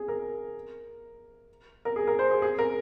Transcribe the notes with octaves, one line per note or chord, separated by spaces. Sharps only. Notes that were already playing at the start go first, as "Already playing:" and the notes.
Already playing: G#4
A#4
A#4
G#4
A#4
C5
G#4
G#4
A#4